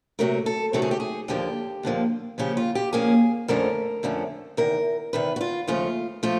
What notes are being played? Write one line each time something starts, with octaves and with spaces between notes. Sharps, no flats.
C3 D#3 F#3 A3 A#4
A4
C3 D#3 F#3 A3 A4
G#4
G4
G#4
D#2 D3 F3 A#3 G4
D#2 D3 F3 A#3
C#3 F3 A#3 C#4 G4
F4
G4
C#3 F3 A#3 C#4 G#4
F2 D3 F3 A3 C#4 A#4
F2 D3 F3 A3 C#4
E2 C3 D#3 A#4
E2 C3 D#3 B4
F#4
F4
D#2 C#3 F3 A3 F4
F3 A3 F4